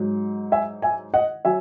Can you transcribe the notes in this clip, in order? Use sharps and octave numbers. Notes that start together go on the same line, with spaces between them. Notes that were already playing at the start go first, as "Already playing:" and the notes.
Already playing: G#2 F#3
E5 G#5
E5 G#5
D#5 F#5
F#3 E5 G#5